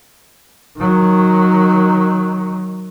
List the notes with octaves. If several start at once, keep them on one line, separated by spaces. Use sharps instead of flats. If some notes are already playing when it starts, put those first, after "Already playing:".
D#3 F#3